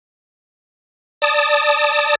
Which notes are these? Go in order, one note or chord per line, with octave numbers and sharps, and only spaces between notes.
D5 A5 D#6